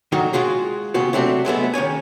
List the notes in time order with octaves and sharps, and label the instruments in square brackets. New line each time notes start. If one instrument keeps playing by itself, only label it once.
[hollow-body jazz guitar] D3 D#3 F#3 D#4 F#4
G#3 F4 F#4 G#4
D#2 C#3 B3 F4 F#4
C3 F#3 A3 C4 D4 F#4
F#3 G#3 A3 B3
D#3 C#4 C#5 G#5